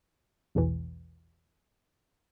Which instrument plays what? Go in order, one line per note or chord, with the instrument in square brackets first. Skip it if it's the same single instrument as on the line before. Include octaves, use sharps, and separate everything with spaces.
[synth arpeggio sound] A#1 E2 B2 E3